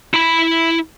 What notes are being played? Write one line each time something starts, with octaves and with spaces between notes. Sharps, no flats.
E4 B5